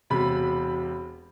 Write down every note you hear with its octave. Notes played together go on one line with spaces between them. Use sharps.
E1 C3 B5